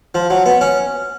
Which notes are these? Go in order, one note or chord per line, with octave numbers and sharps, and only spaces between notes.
F3
F#3
B3
C#4